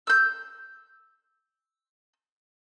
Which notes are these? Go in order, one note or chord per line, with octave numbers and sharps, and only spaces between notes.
E6 G6